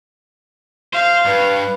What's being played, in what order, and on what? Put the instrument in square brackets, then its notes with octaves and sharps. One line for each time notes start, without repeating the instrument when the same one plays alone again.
[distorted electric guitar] C5 [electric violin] F5
[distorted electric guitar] G2 [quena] B4